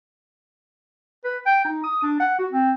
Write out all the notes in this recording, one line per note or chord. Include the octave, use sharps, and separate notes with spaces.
B4
G5
D#4
D#6
D4
F#5
F#4
C4